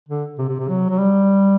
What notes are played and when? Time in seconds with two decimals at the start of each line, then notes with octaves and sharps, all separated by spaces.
0.09 D3
0.38 C3
0.49 C3
0.59 C3
0.68 F#3
0.90 F#3
0.98 G3